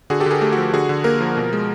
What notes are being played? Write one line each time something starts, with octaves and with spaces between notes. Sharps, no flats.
D3 F#4 G#4
G4 A4
D3 G#4 A#4
A3 G4 A4
F#4 G#4
F3
D3 F#4 G#4
D3
A#3 G#4 A#4
F3
B2
G#3